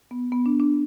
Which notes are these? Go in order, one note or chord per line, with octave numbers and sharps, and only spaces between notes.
B3
B3
D4
D4